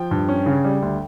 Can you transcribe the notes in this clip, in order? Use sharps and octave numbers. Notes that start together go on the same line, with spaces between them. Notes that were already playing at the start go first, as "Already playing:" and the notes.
Already playing: F3 G5
G2
C#4
C#3
G3
D2